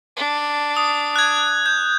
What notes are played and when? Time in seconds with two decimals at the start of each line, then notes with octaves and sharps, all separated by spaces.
0.16 D4
0.77 D#6
1.16 F#6 G#6
1.66 G6